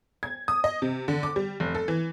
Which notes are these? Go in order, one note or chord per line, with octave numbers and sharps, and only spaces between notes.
G#6
D#6
D#5
C3
D3
D6
G3
F1
A4
E3